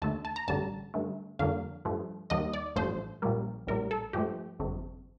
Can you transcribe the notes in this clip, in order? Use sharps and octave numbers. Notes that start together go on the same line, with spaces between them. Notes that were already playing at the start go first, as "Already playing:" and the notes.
D#2 D3 A3 A5
A5
A#5
A1 G2 D3 G3 A5
G2 D3 A3
F2 D3 G3 A#3 F5
G2 F3 A3
D#2 D#3 G3 A#3 D#5
D5
A1 G2 F3 A3 C5
A#1 A#2 G3 A#3
A#1 A2 G3 A#4
A4
G2 F3 A3 G4
G1 F2 C3